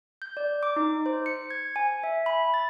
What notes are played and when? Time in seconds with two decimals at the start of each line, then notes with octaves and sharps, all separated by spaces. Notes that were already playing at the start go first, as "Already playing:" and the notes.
0.22 G6
0.37 D5
0.63 D6
0.76 D#4
1.06 C5
1.26 C#7
1.51 G#6
1.76 G#5
2.04 E5
2.26 B5
2.54 A6